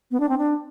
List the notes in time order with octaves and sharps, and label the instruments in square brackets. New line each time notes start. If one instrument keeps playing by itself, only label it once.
[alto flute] B3
D4
C4
D4